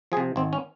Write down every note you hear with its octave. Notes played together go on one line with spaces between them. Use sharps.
F3 G#4
C3
G#1 C4
C#4